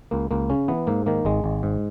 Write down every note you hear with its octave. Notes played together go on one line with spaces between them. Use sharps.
C#2 A#3
C#2 A#3
C#3 C#4
E3 B3
G#2 A#3
D#3 A#3
G#1 G#3
G#1
G#2